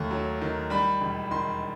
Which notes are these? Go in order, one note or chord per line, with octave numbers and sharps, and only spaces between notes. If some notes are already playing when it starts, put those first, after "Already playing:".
Already playing: D#2 A3
F#3
D#3
G3 B5
E1
D#3 C6